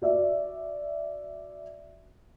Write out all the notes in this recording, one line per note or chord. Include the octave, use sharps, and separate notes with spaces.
F#4 D5 E5